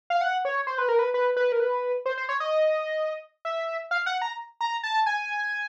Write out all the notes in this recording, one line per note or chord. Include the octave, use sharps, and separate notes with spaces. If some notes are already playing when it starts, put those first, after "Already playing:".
F5
F#5
C#5
C5
B4
A#4
B4
B4
B4
A#4
B4
C5
C5
C#5
D#5
E5
F5
F#5
A#5
A#5
A5
G#5